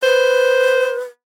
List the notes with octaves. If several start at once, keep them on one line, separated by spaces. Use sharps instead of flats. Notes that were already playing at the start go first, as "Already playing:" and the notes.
B4 C5